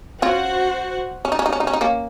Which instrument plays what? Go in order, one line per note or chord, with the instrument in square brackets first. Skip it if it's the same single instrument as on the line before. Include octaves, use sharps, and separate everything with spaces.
[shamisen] C#4 F4 [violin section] F#4 C5 F#5
[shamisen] C#4
D#4
C#4
D#4
C#4
D#4
C#4
D#4
A#3 C#4